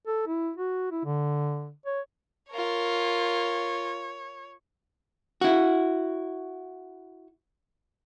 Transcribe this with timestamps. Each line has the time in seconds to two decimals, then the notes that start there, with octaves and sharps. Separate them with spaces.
0.07 A4
0.27 E4
0.57 F#4
0.91 E4
1.05 D3
1.86 C#5
2.52 F4 A#4 C#5
5.41 E4 F#4